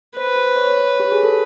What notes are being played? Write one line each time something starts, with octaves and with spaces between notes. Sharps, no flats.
B4 C5
C5
C#5
G4
G#4
A4